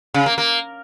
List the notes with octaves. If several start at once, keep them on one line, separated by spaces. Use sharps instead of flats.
C#3
A#3
A#3